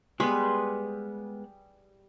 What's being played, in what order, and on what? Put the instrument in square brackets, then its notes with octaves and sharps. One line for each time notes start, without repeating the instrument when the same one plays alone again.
[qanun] G3 G#4 B4 [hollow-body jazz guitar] G#3 B3 [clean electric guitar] C6